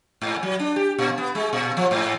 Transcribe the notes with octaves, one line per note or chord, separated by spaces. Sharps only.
G#2
F#3
D4
G4
A#2
B3
G#3
A#2
F3
G#2